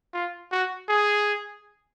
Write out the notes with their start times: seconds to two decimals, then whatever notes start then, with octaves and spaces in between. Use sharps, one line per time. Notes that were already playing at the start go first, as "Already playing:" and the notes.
0.14 F4
0.52 F#4
0.89 G#4